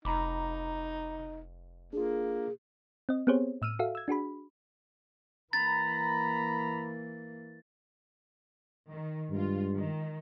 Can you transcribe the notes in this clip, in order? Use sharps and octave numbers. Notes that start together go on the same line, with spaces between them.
F1 D#4 A#5 B5 D6
A#3 D4 F4 G#4
C4 D#5
B3 C4 G4 G#4 C5 C#5
A2 E6 F6 D#7
F#4 A4 E5 F5
E6 G#6
D4 F#4 G#4 B5
E3 A#3 A#5 B5 A6
D#3
G2 G#3 F4
D#3